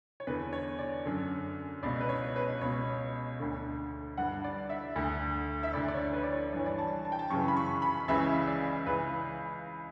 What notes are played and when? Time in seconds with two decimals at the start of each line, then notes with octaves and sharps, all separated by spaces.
0.20 C#5
0.27 E2 D3 B4
0.53 C#5
0.79 D5
1.05 F#2 D3
1.83 C#2 B2 D5
2.00 B4
2.09 C#5
2.36 B4
2.61 C#2 B2 C#5
3.40 D2 D3
4.18 G2 D3 F#5
4.44 D5
4.69 E5
4.96 D2 D3
5.63 E5
5.73 D2 D3 D5
5.88 D5
5.94 C#5
6.13 B4
6.23 D5
6.33 C#5
6.53 G2 D5
6.56 E3 C#5
6.66 D5
6.78 A5
7.05 A5
7.12 G5
7.19 A5
7.30 F#2 C#3 E3 C#6
7.48 B5
7.57 C#6
7.82 B5
8.08 C#2 C#3 E3 E5
8.47 D5
8.86 C#2 C#3 E3 B4